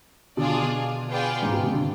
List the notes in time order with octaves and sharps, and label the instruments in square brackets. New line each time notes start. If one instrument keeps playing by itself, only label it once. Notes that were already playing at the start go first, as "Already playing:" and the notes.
[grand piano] B2 D3 [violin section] D4 F4 G#4 D5
[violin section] B3 F4 G#4 D5 G5
[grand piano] G#2
B2
C3
D3